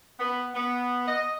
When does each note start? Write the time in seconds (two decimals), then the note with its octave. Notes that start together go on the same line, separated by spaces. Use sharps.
0.19 B3
0.55 B3
1.08 D#5